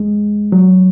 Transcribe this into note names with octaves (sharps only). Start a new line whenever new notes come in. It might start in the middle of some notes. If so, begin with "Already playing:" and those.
Already playing: G#3
F#3